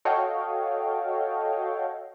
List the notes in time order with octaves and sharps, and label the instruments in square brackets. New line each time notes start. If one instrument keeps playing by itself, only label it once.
[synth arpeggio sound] F#4 A4 C#5 D#5 F5 G5